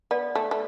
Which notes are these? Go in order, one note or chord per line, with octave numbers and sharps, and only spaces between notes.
B3 D5
A3
A3